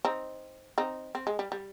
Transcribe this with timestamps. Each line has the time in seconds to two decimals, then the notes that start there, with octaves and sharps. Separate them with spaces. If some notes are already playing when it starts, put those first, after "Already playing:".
0.05 C4 D#4
0.78 C4 D#4
1.15 C4
1.27 G#3
1.39 G3
1.52 G3